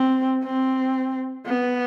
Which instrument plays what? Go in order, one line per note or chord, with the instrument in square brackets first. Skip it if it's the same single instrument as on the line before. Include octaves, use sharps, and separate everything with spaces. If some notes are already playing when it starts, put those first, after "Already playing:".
Already playing: [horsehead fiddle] C4
C4
B3